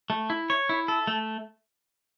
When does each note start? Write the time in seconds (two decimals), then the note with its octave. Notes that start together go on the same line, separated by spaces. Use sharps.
0.10 A3
0.30 E4
0.50 C#5
0.69 E4
0.88 A4
1.07 A3